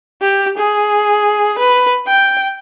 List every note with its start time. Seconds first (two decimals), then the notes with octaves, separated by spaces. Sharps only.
0.21 G4
0.57 G#4
1.59 B4
2.07 G5